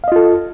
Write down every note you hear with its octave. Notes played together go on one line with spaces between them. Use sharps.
F4 A4 D#5 F5